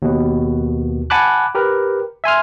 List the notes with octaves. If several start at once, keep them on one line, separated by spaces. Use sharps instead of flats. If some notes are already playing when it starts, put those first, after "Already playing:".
D#2 B2
F#5 G#5 A5 B5 D6 F#6
G4 A#4 B4
E5 G#5 C6 F6